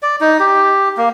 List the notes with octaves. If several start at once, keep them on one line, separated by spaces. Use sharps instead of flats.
D5
D#4
G4
A#3